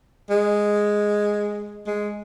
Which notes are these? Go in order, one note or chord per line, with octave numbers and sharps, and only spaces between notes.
G#3
G#3